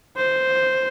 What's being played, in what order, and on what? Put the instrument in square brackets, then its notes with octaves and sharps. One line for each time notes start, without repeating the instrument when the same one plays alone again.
[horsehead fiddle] C5